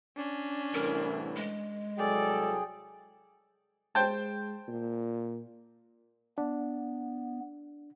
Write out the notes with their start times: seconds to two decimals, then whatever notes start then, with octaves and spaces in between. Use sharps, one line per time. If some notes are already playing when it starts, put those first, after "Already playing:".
0.16 C#4 D4
0.74 C2 A2 E3 A#4
1.36 G#3
1.98 C2 F#3 G#4 A4 D5 G5
3.95 G#3 C5 G5 A5
4.68 A#2
6.38 B3 D4